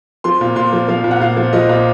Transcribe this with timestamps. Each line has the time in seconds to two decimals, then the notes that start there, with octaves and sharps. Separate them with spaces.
0.24 F3 C6
0.41 A#2
0.56 A#2 C6
0.73 F3
0.88 F3 F5
1.04 A#2
1.11 F#5
1.20 A#2 F5
1.37 F3
1.53 F3 D#5
1.69 A#2